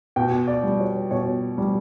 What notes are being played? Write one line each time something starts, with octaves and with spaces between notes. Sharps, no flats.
B2 G5
D5
G3
C#5
B2 C#5
G3